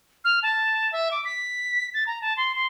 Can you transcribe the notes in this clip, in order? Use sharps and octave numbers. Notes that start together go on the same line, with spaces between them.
F6
A5
E5
D6
B6
A6
A#5
A5
C6
C6